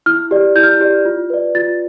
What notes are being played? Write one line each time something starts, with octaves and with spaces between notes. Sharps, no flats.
E4 F6
G4 D5
E4 G6
F6
G6
G4 D5
F4
B4 D5
F4 A6